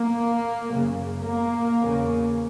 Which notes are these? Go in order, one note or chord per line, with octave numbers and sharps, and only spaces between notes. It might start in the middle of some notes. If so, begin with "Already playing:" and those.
Already playing: A#3
F#2 C#3
A#3
E2 C#3